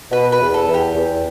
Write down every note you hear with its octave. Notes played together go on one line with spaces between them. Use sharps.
B2 B4
B4
E2
A4
E2
G4
E2